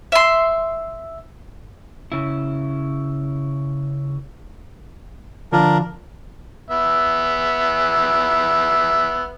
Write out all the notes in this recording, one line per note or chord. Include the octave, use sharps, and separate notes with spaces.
E5 C6
C#3 E4
D3 F3 D4 F4 A#4
B3 E5